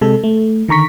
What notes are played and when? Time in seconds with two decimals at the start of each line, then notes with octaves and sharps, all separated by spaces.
0.01 C3 G#3 A4
0.24 A3
0.68 D3 D#3 A#5 C#6 B6